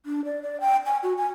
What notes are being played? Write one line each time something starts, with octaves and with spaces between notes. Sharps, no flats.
D4
D5
D5
G5
G#5
F#4
G#5